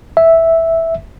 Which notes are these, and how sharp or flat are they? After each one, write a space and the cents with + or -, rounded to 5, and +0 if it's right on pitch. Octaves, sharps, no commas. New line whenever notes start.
E5 -5